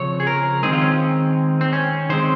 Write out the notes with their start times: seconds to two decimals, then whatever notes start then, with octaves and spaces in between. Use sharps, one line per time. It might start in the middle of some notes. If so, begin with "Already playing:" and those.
Already playing: C#3 F3 C4 C#5
0.20 G#4
0.27 A#4
0.63 D#3 G#3 C4 G#4
0.73 F4
0.81 C#4
1.61 C4
1.73 C#4
2.09 D#3 G#3 C4 C5